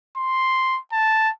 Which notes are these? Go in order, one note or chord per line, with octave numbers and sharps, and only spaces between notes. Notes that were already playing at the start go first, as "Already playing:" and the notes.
C6
A5